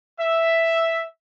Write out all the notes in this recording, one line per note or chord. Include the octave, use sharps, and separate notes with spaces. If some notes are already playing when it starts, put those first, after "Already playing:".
E5